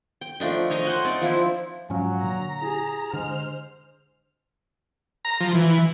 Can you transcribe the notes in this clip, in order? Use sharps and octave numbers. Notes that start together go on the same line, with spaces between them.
G5
F3 A3 D4 D#4
D#4 C#5 D#5 F5
C5 F#5 G#5
C4 D#4 D5
F3 C4 D4 E4
G#2 F3 F#3 C#4 F5 G#5
A#2 D3 A#5
E4 G4 G#4
D3 G#3 C5 F6
A#5
F3
E3